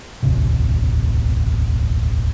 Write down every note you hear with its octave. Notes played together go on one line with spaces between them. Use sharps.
E1 A1 D2 C3